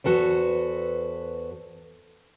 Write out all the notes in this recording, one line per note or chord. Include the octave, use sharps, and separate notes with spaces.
E2 F#4 A4 B4 C5